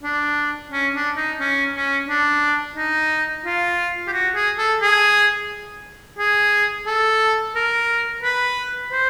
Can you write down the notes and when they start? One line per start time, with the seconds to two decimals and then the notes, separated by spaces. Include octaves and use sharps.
0.03 D4
0.71 C#4
0.94 D4
1.16 D#4
1.40 C#4
1.73 C#4
2.08 D4
2.75 D#4
3.45 F4
4.07 G4
4.12 F#4
4.35 G#4
4.58 A4
4.81 G#4
6.18 G#4
6.86 A4
7.55 A#4
8.23 B4
8.92 C5